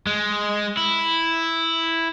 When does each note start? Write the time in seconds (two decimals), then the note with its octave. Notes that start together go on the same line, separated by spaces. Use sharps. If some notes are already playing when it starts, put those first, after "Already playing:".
0.07 G#3
0.77 E4